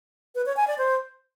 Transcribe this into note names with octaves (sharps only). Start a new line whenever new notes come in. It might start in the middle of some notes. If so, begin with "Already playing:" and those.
B4
C#5
G#5
D5
C5